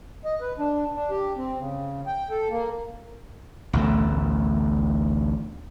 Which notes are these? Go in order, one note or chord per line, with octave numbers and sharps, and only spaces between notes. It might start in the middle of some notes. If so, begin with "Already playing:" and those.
D#5
B4
D4
D4
G4
C4
C#3
G5
A4
A#3
A1 D2 B2 A3